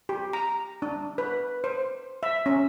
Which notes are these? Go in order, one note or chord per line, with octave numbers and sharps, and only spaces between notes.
G4
A#5
D4
B4
C5
E5
C#4